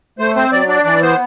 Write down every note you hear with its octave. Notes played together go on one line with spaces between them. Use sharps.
A3 C5
C4 C5
F#3 D5
D4 D5
E3 D5
B3 C5